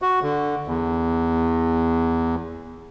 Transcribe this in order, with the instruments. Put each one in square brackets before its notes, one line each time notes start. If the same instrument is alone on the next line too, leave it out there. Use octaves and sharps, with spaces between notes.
[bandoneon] F#4
D3
E2